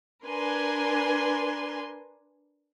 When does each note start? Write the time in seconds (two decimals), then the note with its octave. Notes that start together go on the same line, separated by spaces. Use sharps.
0.25 D4 A#4 B4 G#5 C6